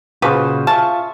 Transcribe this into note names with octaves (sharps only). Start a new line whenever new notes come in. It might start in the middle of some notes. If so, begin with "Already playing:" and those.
A#2 C#3 F4 F#4 G#4 B4 C5
F4 E5 G#5 A5 C#6